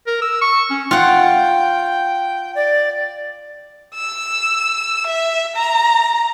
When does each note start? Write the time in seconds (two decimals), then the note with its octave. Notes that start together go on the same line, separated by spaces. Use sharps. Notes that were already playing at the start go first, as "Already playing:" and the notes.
0.07 A#4
0.22 E6
0.42 C#6
0.70 C#4
0.91 F4 F#5 G5
2.55 D5
3.95 E6
5.07 E5
5.56 A#5